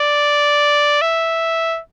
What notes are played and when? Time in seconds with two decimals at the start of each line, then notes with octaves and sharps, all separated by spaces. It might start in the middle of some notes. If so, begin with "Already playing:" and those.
Already playing: D5
1.02 E5